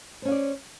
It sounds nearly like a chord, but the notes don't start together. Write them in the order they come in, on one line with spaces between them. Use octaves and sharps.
C5 C#4 F5 D5